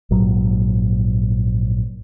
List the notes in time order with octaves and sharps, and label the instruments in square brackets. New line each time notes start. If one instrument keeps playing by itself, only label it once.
[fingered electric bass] A#1 G#2 F#3